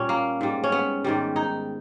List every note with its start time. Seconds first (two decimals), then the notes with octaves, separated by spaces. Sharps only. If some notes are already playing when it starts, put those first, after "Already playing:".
Already playing: A#2 G3 C#4
0.09 A#3
0.41 G#2 G3
0.64 C#4
0.72 B3
1.04 G#2 D#3 G3
1.36 D#4